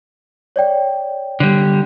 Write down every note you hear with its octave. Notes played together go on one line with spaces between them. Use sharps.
C#5 D5 G5
D3 G3